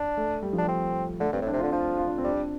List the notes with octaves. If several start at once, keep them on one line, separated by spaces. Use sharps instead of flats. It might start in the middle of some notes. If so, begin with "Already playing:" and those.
Already playing: D4
A3
G3
F3
G3 D4
C4
D3 A3
G2 C4
A2
D4
C3
F4
D3
F3 F4
F4
D4
C4
G3 D4